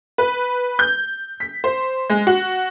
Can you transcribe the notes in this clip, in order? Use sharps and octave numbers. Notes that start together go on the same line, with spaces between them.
B4
G6
B6
C5
G#3
F#4